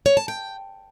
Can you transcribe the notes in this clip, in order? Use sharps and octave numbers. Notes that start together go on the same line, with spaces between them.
C#5
A5
G5